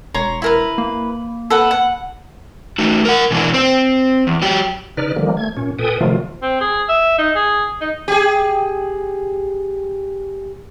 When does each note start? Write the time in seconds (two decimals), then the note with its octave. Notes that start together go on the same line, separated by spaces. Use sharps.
0.14 E1 C#5 A#5 C6
0.42 E4 A#4 B4
0.78 A#3
1.50 A4 B4 F#5
1.71 F#5
2.78 A3 D#4 F#4
3.05 A#4 F#5
3.31 B2 E3 A#3 D4
3.54 C4 C5
4.27 E2
4.42 F#3 G4
4.97 C#3 D#4 B4 D5 F6
5.16 D3 D#3 F3 G3 A#3
5.37 A3 G#6
5.57 A#2 C#4
5.79 A#2 A4 B4 G5 G#5 D#6
6.01 C3 D#3 F3 F#3 A3 F4
6.42 C4
6.61 G#4
6.89 E5
7.18 D#4
7.35 G#4
7.81 D#4
8.08 G4 G#4